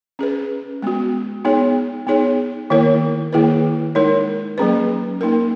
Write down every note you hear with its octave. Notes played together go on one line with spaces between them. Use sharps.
C#4 G#4 B4
G#3 B3 F#4
B3 D#4 G#4 C#5
B3 D#4 G#4 C#5
D#3 A#3 E4 A#4 C#5
D#3 A#3 E4 G#4 B4
G#3 D#4 A#4 C#5
F#3 A#3 C#4 G#4 B4
A#3 D#4 A#4